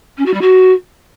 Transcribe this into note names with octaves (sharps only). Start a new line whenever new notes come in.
C#4
F#4
G3
F#4